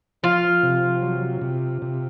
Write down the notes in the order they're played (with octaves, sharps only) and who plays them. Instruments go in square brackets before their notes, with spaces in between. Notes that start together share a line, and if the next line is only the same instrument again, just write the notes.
[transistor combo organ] F3 [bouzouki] F4
[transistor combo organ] C3
F#3
C3
C3